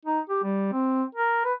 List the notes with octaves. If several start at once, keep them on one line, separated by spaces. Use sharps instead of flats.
D#4
G4
G3
C4
A#4
B4